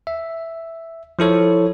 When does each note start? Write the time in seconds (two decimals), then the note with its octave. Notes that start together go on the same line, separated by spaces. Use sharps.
0.07 E5
1.19 F3 E4 A4 C#5